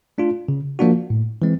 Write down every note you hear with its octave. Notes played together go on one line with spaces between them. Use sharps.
A3 D4 F4
C#3
F3 A#3 D4 F#4
A2
E3 G#3 C4